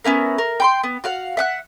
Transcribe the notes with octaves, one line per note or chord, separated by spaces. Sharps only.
B3 C#4 E4 A#4
A#4
G5 B5 C6
B3
F#4 F5 F#5
E5 F#5 F#6